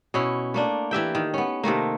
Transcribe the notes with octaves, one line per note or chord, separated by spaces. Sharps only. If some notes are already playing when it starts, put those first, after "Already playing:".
B2 C#4 E4
A3 A#3 D4
E3 G4 E5 G5
D#3
B3 C#4
C3 D#3 A3 A#3